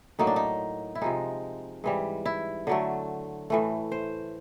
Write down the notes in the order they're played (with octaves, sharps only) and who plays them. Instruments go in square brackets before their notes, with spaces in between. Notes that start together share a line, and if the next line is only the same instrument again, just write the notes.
[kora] A2 F#3 A#3 D#4
D4
D#4
E4
C3 F3 G#3 D#4
G#2 E3 G3
E4
D3 F#3 A3
A2 E3 A3
C5